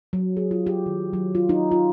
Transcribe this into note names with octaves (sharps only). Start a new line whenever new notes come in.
F#3
G#4
F4
G4
D#3
F#3
F4
D#4
F4